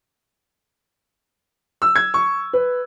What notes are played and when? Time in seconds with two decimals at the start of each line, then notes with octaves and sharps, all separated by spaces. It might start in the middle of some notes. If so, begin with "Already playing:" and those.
1.82 E6
1.96 G#6
2.14 C#6
2.53 B4